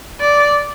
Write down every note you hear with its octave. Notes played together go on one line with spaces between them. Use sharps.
D5